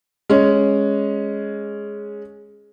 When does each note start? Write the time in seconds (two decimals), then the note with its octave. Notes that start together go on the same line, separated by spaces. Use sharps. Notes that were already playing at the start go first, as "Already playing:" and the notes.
0.29 G#3 C#4